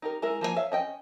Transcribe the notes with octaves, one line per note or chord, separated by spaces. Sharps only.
D#4 G4 A#4
G#3 E4 A#4
F3 A#3 G#4 G#5
C#5 E5 F5
C#4 D#5 G5